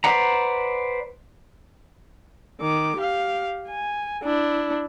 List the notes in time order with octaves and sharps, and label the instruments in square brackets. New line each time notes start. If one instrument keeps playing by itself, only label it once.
[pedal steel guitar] B4 C5 D5 F#5 A#5
[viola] D#3 D6
G4 F5
G#5
D4 E4